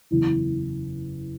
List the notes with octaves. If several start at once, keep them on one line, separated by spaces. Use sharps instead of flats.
F#1 E2 E3